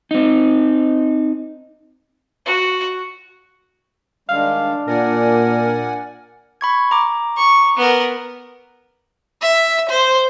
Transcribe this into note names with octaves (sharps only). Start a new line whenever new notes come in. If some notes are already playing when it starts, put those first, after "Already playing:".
C4 D#4
F#4
D#3 G3 G#3 D4 F5
A#2 A#4 D5 F#5 G#5
B5 C#6 G#6
A#5 D6
C#6
B3 A#4
E5
C5